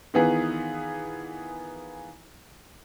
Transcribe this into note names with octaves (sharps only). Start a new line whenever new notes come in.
D#3 E3 B3 F4 G#4